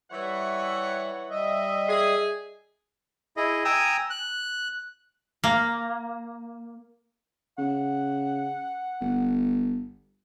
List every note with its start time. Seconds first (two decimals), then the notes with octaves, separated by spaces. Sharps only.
0.12 E3 G3 C#5 E5 F#5
1.30 G3 D#5 E5
1.89 G#4
3.37 E4 G#4 D#5
3.65 G5 G#5 A#5 D#6 E6
4.10 F#6
5.44 A#3
7.58 C#3 F#5
9.01 G1